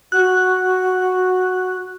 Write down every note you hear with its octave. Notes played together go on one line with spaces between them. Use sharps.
F#4 F#6